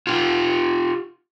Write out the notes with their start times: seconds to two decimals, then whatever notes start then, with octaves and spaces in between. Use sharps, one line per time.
0.07 F4 G4